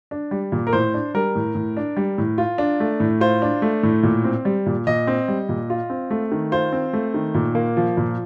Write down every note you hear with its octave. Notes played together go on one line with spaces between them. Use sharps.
D4
G3
A#2
A#4
A2 C5
D4
G3 A#4
A2
A2
D4
G3
A2
F4
D4
A3
A2
F4 C5
D4
A3
A2
A#2
C4
G3
A#2
A#2 D#5
C4
G3
A#2
F4
C4
A3
D#3
F4 C5
C4
A3
D#3
A#2
A#3
F3
A#2